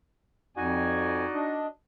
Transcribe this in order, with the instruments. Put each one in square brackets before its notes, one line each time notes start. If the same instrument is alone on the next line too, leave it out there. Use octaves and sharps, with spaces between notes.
[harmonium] F2 G#5 [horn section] D#4 F#4 D5
[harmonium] D4 D#5